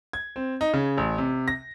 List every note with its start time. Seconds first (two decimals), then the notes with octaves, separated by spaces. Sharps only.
0.13 G#6
0.36 C4
0.61 D#4
0.74 C#3
0.97 A1
1.18 C3
1.48 A#6